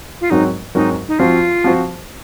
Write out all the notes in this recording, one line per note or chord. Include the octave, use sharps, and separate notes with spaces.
F4
G#2 F#3 C4 D#4 F#4 A#4
G#2 F#3 C4 D#4 F#4 A#4
D#4
F3 C4 F4 F#4 C5
F3 C4 F#4 C5